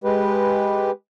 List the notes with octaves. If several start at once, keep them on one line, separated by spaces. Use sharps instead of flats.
G#3 G4 B4